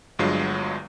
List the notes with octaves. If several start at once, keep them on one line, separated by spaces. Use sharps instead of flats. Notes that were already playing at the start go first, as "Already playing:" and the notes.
G1 G2 F#3 G#3 F4 C7